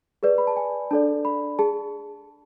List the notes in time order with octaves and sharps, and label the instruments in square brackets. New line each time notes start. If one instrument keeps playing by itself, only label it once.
[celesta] G#4 B4 D5
B5
A5
G#5
D4 A4 D5 A5
B5
G#4 A5